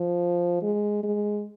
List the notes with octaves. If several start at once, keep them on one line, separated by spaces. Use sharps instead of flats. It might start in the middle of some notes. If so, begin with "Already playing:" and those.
Already playing: F3
G#3
G#3